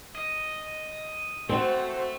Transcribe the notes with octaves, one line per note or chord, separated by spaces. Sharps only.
D#5
A3 C4 F#4 C5